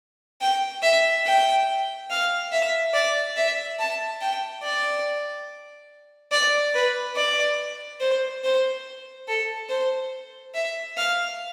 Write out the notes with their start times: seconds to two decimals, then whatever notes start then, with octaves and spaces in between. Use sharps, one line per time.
0.41 G5
0.82 E5
1.26 G5
2.10 F5
2.52 E5
2.94 D5
3.37 E5
3.79 A5
4.21 G5
4.63 D5
6.32 D5
6.75 B4
7.17 D5
8.00 C5
8.44 C5
9.28 A4
9.70 C5
10.55 E5
10.97 F5